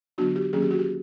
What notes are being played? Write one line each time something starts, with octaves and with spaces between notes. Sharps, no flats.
D3 F#3 B3 D4 F#4
G4
D#3 F#3 A#3 C#4 G#4
G4
F#4
G4